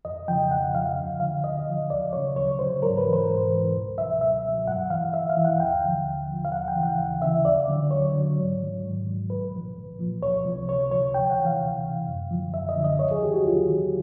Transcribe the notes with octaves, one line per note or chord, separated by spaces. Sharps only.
F2 D#5
C#3 F3 G5
F2 F#5
C#3 F3 F5
D2
D3 F3 F5
D2 D#5
D3 F3
D2 D5
C#3 F#3 C#5
D2 C#5
C#3 F#3 C5
G#2 A#4
B4
E3
C5
G#2
E3
C#2
B2 F#3 E5
C#2 E5
B2 F#3
G2 F#5
E3 F5
G2 E5
F5
E3
F#5
D#2 G5
D3 F3
D#2
D3 F3
F5
D#2 F#5
G5
C#3 E3
F#5
D#2 F5
C#3 E3 E5
D2 D5
D3 F#3
D2 C#5
D3 F#3
G#2
D#3 F#3
G#2
D#3 F#3
C2 B4
A#2 F3
C2
A#2 F3
C#2 C#5
C3 F3
C#2 C#5
C3 F3 C#5
D2 G5
F#5
C3 E3
F5
D2
C3 E3
F#2
D3 F3
F#2 E5
D#5
D3 F3
D#5
D#2 C#5
G#4
D#3 F#3 G4
F#4
D#2 F4
D#3 F#3